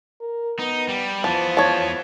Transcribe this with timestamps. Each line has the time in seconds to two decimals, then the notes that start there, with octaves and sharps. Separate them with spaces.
0.21 A#4
0.59 B3 D#4
0.88 G3
1.24 E3 F3 B3 A5
1.57 C#5 A5